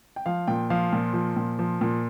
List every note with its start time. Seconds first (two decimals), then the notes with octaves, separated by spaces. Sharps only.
0.16 G5
0.26 F3 F5
0.48 A#2 G5
0.70 F3 F5
0.93 A#2
1.14 F3
1.36 A#2
1.59 F3
1.81 A#2